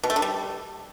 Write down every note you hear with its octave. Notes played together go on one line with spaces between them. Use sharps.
B2
A3
D3
G3